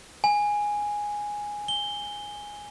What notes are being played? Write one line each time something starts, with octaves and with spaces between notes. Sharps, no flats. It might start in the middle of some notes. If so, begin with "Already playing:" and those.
G#5
G7